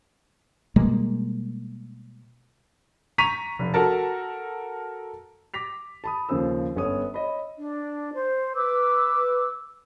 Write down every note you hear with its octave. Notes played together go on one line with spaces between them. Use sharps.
B2 G3 G#3 A#3
A#5 C#6 B6 D#7 F7
F1
F#4 A4 A#4 A5
D6 A#6 B6 F7
A5 B5 D#6
D#2 C#3 F3 A4 C5 E6
G1 B3 C#4 B4 C#5 D#6
C#5 D#5 B5
D4
C5
B4 D6 E6